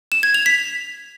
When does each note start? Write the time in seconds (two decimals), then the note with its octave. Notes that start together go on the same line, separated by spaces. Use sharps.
0.12 E7
0.23 G#6
0.34 F7
0.46 B6